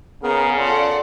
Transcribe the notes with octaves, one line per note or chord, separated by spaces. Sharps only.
C#3 B3 G#4 A#4
F4 A4 D5 F#5